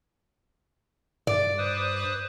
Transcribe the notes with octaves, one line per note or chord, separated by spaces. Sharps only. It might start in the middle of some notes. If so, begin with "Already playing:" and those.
G2 D5
B4 C5 D#6